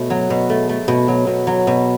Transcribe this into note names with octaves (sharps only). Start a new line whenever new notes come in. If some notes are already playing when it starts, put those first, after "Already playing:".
Already playing: B2 A3 C#5
F#3
B2
A3
A3
B2
F#3
B2
F#3
B2